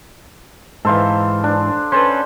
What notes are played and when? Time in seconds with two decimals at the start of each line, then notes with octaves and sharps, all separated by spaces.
0.85 G#2 E3 A4 C5 F5
1.44 D4
1.92 C#4 A4 B4 C5